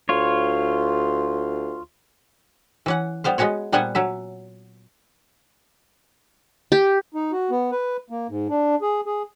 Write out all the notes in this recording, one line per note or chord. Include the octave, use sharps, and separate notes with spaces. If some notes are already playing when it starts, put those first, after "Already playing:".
D2 F4 C#5
E3 C#4 F#5
G3 B3 C5 F5
G#3 B3 C#4 F#4 C#5
A#2 G3 B3 C5 F#5 G#5
F#3 C#4 E5
G4
D#4
F#4
B3
B4
A#3
G#2
D4
G#4
G#4